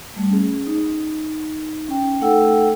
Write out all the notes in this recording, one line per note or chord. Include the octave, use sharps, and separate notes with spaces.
G3 A3
C#4 G#4
D#4
C#4 G5
A3 D#4 A4 F#5 G5 E6